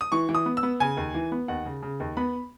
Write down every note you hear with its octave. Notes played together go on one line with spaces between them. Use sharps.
D#6
E3 C#6
E3
D#6
B3
E6
B3
C#3 G#5
D#2
E3
B3
D#2 F#5
C#3
C#3
D#2
B3 B5